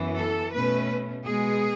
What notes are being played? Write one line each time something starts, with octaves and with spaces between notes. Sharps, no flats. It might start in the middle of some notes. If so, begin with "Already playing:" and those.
Already playing: F#2 E3 B3
A4
B2 A3 C#4 B4
B2 G#3 B3 G#4